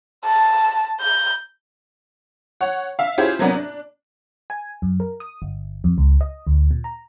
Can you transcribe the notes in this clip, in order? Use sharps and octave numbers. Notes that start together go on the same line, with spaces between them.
A5
G6
C#5 F#5
E5 F5
C#4 E4 F4 G4 G#4 C5
C3 F#3 A#3 B3 C#4 D4
D4
G#5
F#2
A#4
D#6
G1
F2
C#2
D#5
D2
A#2
A#5